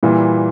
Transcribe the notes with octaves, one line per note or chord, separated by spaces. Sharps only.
A#2 E3 G3 E4